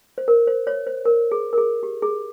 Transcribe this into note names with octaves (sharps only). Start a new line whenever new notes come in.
C5
A#4
C5
C#5
C5
A#4
G#4
A#4
G#4
G4
G#4